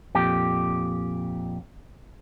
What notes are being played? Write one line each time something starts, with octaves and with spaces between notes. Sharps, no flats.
F2 A#2 G4